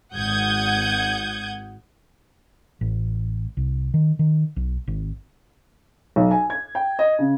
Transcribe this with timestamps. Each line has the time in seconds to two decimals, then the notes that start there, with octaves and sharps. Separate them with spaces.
0.15 G#1 F#5 D#6 G6 G#6
2.81 A1
3.57 C2
3.94 D#3
4.19 D#3
4.56 B1
4.88 G#1
6.16 B1
6.31 G#5
6.50 G#6
6.75 G5
6.99 D#5
7.19 C#3